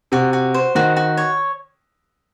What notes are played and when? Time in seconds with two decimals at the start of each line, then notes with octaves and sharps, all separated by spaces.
0.12 C3 F#4
0.33 F#4
0.54 C5
0.75 D#3 F#4
0.97 F#4
1.17 C#5